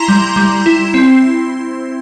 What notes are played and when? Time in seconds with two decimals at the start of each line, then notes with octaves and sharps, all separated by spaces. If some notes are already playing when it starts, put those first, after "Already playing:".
Already playing: E4 A#5 C6
0.08 G3
0.36 G3
0.66 E4
0.94 C4